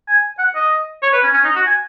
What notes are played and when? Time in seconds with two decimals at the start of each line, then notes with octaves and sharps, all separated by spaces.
0.08 G#5
0.39 F#5
0.55 D#5
1.03 C#5
1.13 B4
1.24 C#4
1.34 C#4
1.45 D#4
1.55 F#4
1.67 G#5